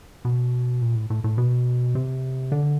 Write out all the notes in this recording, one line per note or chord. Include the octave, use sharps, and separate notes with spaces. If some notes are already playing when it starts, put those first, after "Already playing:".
B2
A#2
A2
A2
A2
B2
C3
D3